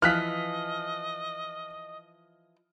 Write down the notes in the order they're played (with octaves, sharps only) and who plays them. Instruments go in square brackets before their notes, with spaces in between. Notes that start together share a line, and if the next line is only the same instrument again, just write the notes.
[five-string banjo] E3 F3 [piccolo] D#5 [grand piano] F6 F#6 B6